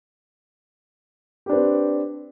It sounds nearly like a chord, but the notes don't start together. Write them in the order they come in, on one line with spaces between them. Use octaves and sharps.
G4 D4 B4 C4